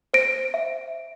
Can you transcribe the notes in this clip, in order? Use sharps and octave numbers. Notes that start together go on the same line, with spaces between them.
C5 A#6 D7
E5